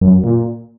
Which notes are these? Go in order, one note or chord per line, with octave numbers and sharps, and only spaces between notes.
F#2
A#2